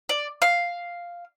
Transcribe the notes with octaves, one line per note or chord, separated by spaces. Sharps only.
D5
F5